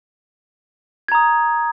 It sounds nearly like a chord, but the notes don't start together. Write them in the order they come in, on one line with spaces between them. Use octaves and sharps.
G#6 A#5 D#6